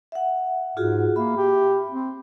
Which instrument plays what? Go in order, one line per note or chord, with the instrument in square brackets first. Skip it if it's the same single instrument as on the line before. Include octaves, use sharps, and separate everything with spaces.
[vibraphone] E5 F#5
[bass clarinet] G#2 [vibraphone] F4 F#4 G#4
[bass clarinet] A#3 [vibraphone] E5 B5
[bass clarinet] G4
C4